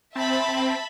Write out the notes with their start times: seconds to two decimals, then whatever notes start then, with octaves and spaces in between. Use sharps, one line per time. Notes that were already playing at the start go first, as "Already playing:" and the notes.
0.16 C4 E5 A5 B5